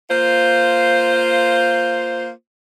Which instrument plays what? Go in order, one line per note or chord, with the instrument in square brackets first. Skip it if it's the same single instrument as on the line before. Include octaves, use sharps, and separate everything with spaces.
[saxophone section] A#3 F4 C5